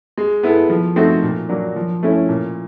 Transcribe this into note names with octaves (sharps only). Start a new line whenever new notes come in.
G#3
B3 E4 A4
F3
A3 C4 D#4 F#4
A#2
F#3 A#3 D4
F3
A3 C#4 E4
A#2